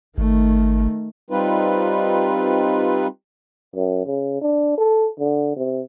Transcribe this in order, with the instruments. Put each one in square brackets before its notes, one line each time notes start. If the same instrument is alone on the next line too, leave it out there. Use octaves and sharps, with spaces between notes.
[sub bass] G#1 [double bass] D#3 A3
[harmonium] G3 C4 D#4 F4 B4
[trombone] F#2
C#3
D4
A4
D3
C3